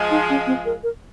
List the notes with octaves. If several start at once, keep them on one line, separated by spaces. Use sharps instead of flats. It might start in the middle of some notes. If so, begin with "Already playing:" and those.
Already playing: F3 G#3
D#4
C#4
C4
A#4
A#4